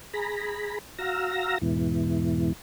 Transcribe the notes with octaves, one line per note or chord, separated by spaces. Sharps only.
G#4 A#5 B5
F#4 F5 A#5 E6 A#6
E2 G#2 B2 E3